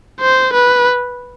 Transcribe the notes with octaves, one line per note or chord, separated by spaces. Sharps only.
C5
B4